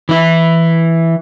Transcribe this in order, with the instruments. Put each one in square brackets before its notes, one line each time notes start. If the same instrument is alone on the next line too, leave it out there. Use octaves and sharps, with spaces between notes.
[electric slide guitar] E3 E4